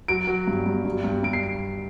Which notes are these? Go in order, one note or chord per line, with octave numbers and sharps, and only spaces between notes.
F#3 D7
F#3
G2
G2
G2
G2
G2 D7
C7